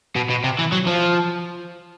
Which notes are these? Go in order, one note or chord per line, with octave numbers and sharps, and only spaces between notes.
B2
B2
C3
E3
F#3
F3